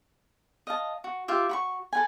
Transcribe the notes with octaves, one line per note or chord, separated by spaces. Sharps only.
D#5 F5 A5
F#4
F4 G4 E5
F#4 B5 C#6
A4 B4 G#5